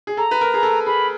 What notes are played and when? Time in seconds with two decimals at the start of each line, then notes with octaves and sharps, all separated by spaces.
0.07 G#4
0.17 A4 A#5
0.31 B4
0.41 A#4
0.54 G#4
0.63 A4
0.86 G#4 B5